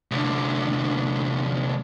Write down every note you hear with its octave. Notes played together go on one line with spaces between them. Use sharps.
C2 D3